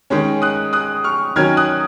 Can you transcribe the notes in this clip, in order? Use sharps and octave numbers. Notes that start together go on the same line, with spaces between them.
D#3 G#3 C#4
D#6 F#6
D#6 F#6
C#6 F6
D#3 F#3 C#4 F6 G#6
D#6 F#6